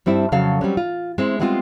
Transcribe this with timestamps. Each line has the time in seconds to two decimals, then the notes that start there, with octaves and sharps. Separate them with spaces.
0.06 G2 G3 C4 E4
0.32 F2 C#3 F#3 A4 F5
0.61 F#3 G3 C4 C#4
0.77 F4
1.18 G#3 C4 E4
1.40 G3 G#3 B3 C4 D4 F4